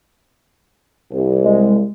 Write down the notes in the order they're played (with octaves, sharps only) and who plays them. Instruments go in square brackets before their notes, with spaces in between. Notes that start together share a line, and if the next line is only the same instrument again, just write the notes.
[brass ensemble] C2
[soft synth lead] G#3